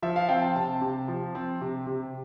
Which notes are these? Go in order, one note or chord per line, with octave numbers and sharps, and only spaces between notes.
F3 E5
F5
C4 G5
A5
C3 A5
C3
F3
C4
C3
C3